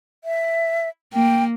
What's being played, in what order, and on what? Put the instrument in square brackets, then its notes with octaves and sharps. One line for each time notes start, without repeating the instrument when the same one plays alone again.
[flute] E5
[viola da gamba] A#3 [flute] G5